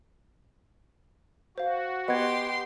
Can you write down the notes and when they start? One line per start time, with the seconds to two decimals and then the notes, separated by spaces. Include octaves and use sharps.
1.58 F#4 C5 F5
2.08 B3 G4 D#5 C6 G#6